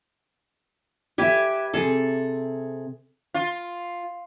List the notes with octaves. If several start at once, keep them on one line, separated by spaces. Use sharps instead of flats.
G4 B4 E5 G#5
C3 G#4 A4
F4